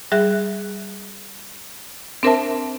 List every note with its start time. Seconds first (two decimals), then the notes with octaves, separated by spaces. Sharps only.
0.12 G3 G#4 E5 F#6
2.23 C4 D4 A#4 C5 E5 A5